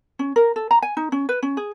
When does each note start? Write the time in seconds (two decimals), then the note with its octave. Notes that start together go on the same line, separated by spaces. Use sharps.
0.19 C#4
0.36 A#4
0.56 A4
0.71 A#5
0.82 G#5
0.97 D#4
1.12 C#4
1.29 B4
1.43 C#4
1.57 G#4